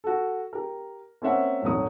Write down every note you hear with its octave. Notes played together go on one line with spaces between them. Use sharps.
F#4 A4
G4 A#4
A#3 C4 C#4 E5 F#5
D#1 G#1 F#3 D#6